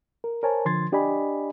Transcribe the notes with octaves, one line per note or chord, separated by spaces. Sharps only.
A#4
A#4 C5 C#5 G#5 A5
D3 F3 C6 G#6 A6
D4 G4 D5 D#5 G#5 B5